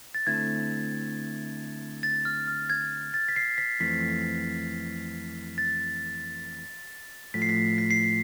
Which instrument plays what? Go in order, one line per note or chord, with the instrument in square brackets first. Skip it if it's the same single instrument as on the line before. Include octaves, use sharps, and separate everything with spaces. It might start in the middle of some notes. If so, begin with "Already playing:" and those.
[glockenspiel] A6
[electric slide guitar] D3 A3 C4 E4 [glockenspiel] G#6
[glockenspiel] A6
F6
F6
G#6
A6
B6
C7
B6
[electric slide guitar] F2 E3 A3 C4 [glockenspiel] B6
[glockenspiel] A6
[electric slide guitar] A2 F3 A3 [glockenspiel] B6
[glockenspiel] C7
B6
B6
C7
B6